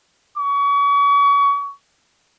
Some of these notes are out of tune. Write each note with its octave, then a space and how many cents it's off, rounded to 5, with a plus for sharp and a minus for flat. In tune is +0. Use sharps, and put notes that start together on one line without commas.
C#6 +35